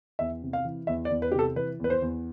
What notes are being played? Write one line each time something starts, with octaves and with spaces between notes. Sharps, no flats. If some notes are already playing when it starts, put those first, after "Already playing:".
E2 E5
C3
F5
E3
E2 E5
D5
E2
B4
C3 G4
A4
E3 B4
E2 B4
C5
E2